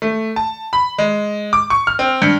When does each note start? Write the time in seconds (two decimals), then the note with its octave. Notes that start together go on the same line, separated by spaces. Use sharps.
0.02 A3
0.36 A5
0.73 B5
0.98 G#3
1.53 D6
1.70 C#6
1.87 F6
1.99 C4
2.22 G2